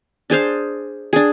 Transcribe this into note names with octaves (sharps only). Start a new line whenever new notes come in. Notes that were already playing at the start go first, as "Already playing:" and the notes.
D4 G#4 C5 F5
D4 G#4